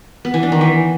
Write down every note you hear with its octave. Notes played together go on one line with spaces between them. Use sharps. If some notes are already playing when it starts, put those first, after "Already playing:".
B3
E3
D4
D#3
E3